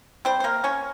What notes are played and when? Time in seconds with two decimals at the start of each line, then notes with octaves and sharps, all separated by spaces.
0.25 G3 C4 C5
0.40 C5
0.44 C3 A#3 A#4
0.64 A#3 C#4 C#5